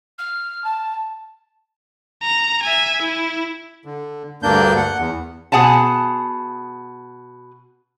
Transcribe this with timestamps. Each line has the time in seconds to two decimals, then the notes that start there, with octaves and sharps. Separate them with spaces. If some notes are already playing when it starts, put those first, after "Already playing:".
0.18 F6
0.64 A5
2.22 A#5
2.62 E5 G#5
3.01 E4
3.85 D3
4.43 D2 G2 A#3 D4 G6
4.77 F#5
4.98 E2
5.52 B2 G#4 F#5 G#5 A5